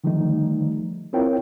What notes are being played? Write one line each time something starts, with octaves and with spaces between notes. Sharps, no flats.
D3 D#3 F3 G3 A3 D#4
C4 E4 F4 A#4 C#5 G5